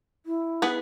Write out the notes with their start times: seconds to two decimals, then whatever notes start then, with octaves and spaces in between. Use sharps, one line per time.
0.26 E4
0.62 B3 G#4 B4